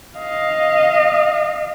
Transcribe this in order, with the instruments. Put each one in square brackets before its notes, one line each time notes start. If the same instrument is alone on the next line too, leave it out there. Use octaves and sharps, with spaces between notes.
[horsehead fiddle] D#5 F5